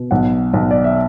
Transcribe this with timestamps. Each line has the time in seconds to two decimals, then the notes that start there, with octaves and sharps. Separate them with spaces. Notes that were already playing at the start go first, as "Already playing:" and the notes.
Already playing: B2
0.11 B1 F#5
0.54 B1
0.71 D5
0.84 E5